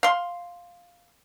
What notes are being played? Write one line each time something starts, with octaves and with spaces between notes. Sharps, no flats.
F5 C6